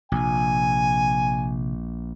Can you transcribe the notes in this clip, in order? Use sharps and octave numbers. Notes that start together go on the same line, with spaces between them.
A#1 C3 G#5